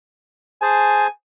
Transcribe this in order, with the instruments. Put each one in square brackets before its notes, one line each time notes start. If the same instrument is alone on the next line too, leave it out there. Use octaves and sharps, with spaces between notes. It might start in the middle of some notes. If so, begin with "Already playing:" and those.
[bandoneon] G#4 C5 A5 [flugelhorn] G#5